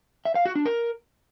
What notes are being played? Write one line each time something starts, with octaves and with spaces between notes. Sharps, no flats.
E5
F5
F#4
D4
A#4